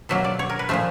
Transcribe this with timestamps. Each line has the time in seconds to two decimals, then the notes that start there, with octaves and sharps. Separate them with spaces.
0.09 B2 F#3 A#3 E5
0.24 D5
0.39 C#5
0.50 A#4
0.59 B4
0.69 A#2 F3 A3 E5